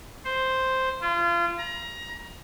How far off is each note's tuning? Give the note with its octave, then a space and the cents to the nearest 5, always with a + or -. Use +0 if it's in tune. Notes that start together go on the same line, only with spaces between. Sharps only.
C5 +0
F4 -30
A#5 +25